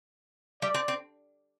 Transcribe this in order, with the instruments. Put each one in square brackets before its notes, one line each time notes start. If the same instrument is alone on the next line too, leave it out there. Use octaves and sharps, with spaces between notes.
[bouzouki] G3 [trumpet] D5
[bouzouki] C4
C4